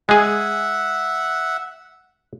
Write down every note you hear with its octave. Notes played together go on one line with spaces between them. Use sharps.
G#3 G#4 E5 F#5